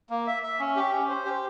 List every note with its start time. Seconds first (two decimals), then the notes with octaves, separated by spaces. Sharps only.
0.10 A#3
0.27 E5
0.43 E5
0.60 C#4
0.76 G4
0.93 C#4
1.09 C5
1.26 G4